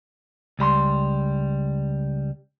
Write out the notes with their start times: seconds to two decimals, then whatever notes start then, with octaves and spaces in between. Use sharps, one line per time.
0.59 C#2 G3 B5 C6